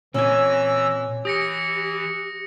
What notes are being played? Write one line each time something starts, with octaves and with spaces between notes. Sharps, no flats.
A#2 E3 C4 C#4 G#5 E6 A#6
E3 G4 D#6 A#6 C#7